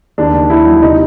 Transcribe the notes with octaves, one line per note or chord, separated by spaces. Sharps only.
D#2 D4
D#3
D#2 E4
F#3
C3 D#4